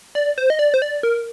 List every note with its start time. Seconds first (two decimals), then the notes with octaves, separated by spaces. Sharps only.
0.15 D5
0.38 C5
0.50 D#5
0.59 D5
0.74 C5
0.82 D5
1.03 A#4